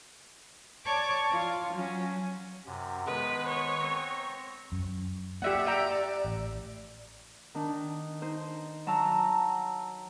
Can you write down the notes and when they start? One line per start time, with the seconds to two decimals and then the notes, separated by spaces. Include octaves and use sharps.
0.85 C#5 D5 A5 C#6 D6
1.29 F4
1.73 F#3 C#4
2.66 F#2 C3
3.07 D#3 G#3 B3 B4
3.49 C#5
3.80 C4 A#5
4.72 F#2
5.42 A#3 G4 D5 E5 F#5
5.66 E5 G5 A#5
6.24 A1
7.55 D#3 D4
8.22 D#4 C5
8.87 F#3 A5 A#5 E6